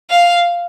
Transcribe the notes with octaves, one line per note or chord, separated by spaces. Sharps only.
F5